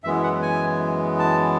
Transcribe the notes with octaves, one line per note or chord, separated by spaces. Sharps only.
F#2 E3 G#3 B3 E5
F#5
G#5
A5